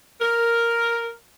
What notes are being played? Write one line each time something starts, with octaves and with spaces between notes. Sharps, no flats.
A#4